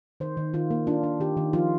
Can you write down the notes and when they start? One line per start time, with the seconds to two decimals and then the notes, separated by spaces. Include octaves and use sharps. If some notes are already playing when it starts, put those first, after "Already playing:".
0.20 D#3 C5
0.37 D#3
0.54 D#3 F4
0.70 A#3
0.87 D4 F4
1.03 D4
1.20 D#3 G4
1.37 D#3
1.53 F3 F4